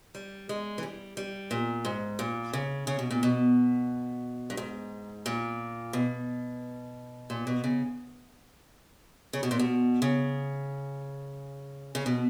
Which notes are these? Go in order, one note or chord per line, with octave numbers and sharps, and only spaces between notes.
G3
G#3
E3
G3
G3
A#2
G#2
A#2
C#3
C#3
B2
A#2
B2
G2
G#2
A#2
B2
A#2
B2
C#3
C#3
B2
A#2
B2
C#3
C#3
B2